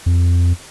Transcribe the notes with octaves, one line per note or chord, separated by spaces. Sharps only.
F2